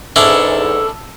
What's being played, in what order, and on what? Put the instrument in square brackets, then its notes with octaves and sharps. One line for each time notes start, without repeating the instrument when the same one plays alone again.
[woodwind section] E2 G#2 [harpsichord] C#4 D4 E4 [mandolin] A4